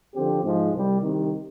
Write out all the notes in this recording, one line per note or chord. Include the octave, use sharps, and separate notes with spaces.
D3 F3 C4 G4
G#2 F3 G#3
C2 C3 G3
C2 C3 D#3